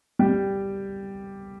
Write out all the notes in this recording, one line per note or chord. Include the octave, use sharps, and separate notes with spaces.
G3 G4